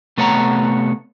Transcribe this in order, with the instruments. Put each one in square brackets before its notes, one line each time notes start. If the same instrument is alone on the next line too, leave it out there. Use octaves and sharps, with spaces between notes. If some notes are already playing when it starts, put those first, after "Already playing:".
[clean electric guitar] C3 A3 B3 C#5 F#5 A#5